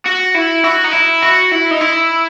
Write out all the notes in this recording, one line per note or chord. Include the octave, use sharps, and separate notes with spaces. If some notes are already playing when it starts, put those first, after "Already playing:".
F#4
E4
F#4
D#4
E4
F#4
E4
D#4
E4